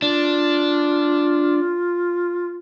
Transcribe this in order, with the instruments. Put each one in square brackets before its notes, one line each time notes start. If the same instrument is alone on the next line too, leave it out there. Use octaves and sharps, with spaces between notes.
[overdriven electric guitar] D4 [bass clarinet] F4